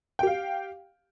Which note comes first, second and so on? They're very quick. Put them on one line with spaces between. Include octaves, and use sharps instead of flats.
G5 G4 F5